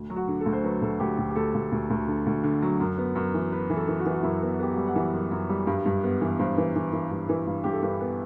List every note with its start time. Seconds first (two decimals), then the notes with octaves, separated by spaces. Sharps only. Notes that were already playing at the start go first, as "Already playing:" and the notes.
Already playing: D2
0.10 F#3
0.16 F#4
0.28 D3
0.40 A4
0.46 D2
0.52 C5
0.64 F#3 B4
0.82 D2 A4
0.99 D2 G4
1.18 D2 G4
1.30 G4
1.36 D2 A4
1.54 D2
1.72 D2
1.90 D2
2.07 D3
2.26 D2
2.44 D3
2.62 F#3
2.80 F#2
2.98 B3
3.15 F#2
3.34 E3
3.52 B3 B4
3.70 E3
3.76 A4
3.88 E3
3.99 F#4
4.06 E3
4.12 F#4
4.23 F#2 E4
4.42 B3
4.59 B3 G4
4.71 F#4
4.77 G3
4.87 F#5
4.95 E3 E5
5.13 F#2
5.32 F#2
5.49 G3
5.67 G2
5.85 G2
6.03 B3
6.21 E3
6.39 G2 C5
6.58 E3
6.76 E3
6.93 E3
7.11 G2
7.29 E3
7.47 G2
7.64 G2 G4
7.73 A4
7.82 G2 B4
8.01 B3